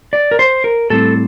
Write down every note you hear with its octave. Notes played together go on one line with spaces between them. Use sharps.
D5
A#4
C5
A#4
A2 G3 C4 A4